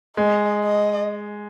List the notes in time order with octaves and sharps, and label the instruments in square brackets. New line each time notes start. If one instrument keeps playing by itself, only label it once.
[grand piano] G#3 [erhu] D#5
[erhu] D#5